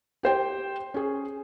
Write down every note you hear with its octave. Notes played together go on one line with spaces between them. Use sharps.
G4 C5 G5
C#4 G#4